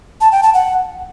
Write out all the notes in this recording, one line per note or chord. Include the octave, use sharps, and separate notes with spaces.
A5
G5
A5
F#5